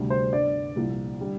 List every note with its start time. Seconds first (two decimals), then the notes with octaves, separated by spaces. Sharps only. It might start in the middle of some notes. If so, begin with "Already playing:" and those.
Already playing: D2 C3 G3 D4
0.10 C5
0.32 G1 G2 D3 D5
0.76 C2 A#2 F3
1.20 D3 G3